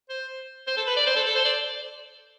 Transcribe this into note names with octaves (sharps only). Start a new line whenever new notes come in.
C5
C5
A4
B4
D5
C5
A4
A4
C5
D5